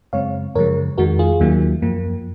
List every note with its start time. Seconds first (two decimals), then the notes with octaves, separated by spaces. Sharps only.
0.13 F#2 C#3 G#3 C4 C#5 F5
0.55 F#2 C#3 F3 G#3 A#4 C#5
0.98 F2 D#3 G#3 F#4 A#4
1.19 F4 G#4
1.40 D#2 D#3 F#3 A#3
1.82 F#2 F3 A#3